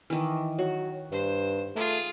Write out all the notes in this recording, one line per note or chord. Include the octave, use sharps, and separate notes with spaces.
D#3 E3
F#3 F#4
G2 C5
A3 F4 G#4